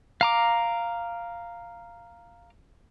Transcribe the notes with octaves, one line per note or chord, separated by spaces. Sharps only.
F5 A#5 D6